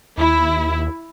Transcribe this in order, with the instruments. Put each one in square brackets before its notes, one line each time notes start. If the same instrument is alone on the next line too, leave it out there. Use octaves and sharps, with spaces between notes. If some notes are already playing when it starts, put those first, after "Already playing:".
[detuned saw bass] D#2 [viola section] E4